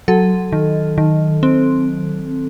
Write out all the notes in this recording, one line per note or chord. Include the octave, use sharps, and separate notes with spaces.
F#3 A4
D#3
D#3
C4